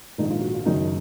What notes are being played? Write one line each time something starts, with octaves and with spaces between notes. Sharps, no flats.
A#1 G#2 D#3 D#4
F4
F#4
F4
F#1 F#2 D#3 D#4